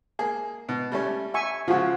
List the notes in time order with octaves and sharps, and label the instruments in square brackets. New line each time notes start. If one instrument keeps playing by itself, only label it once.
[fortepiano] A#3 G#4
B2
G3 A3 C#4
[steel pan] E5 G#5 C#6
[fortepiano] C#3 F3 [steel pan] F4 F#4